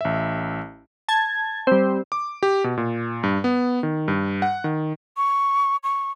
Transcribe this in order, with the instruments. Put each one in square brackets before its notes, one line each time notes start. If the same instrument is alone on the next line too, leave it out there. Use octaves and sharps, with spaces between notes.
[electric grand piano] A1 E5
[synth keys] A5 G#6
G3 C4
[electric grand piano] D6
G4
B2
A#2
G2
B3
D#3
G2
F#5
D#3
[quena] C#6
C#6